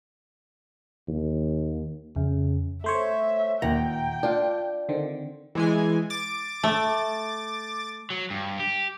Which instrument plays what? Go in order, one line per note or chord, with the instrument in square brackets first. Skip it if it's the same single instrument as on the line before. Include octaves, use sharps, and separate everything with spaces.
[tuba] D#2
[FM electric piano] F2 [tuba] C#3
[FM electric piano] A3 C5 C#5 [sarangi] E5
[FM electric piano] D#2 A#2 A#5 [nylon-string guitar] F#5 [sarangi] G5
[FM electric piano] D4 [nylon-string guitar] F4 D5
[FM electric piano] D3 D#3 C4
[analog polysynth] E3 G#3 G#5
D6 A6
[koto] A3
[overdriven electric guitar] F#3
G2
G4